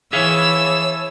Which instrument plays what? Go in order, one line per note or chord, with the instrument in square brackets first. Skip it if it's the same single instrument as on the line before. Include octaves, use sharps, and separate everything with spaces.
[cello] E3 [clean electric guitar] G#4 E5 F5 [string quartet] C#5 A5 [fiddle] E6